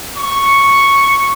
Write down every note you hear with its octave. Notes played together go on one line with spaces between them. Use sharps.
C#6